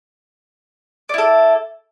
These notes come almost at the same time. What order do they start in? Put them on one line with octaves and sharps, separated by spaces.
D5 E4 A4